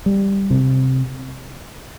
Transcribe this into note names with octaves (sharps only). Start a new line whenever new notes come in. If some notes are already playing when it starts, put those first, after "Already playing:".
G3
C3